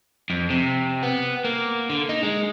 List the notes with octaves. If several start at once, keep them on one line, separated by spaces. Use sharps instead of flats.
F2
C3
B3
A#3
D3
D#4
G#3